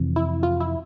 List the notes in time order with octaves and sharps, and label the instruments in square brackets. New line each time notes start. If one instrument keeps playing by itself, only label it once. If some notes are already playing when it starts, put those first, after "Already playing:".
Already playing: [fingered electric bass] F2 C3 E3
[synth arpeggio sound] E4
F4
E4